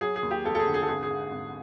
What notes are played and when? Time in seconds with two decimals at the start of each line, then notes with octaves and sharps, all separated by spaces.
0.01 F#3 G#4
0.16 G#4
0.22 D#2
0.31 G4
0.44 F1 A4
0.55 A4
0.59 G#4
0.66 D3
0.74 G#4
0.82 A4
0.88 G#1 G#4
1.03 G#4
1.11 G#2
1.31 G#1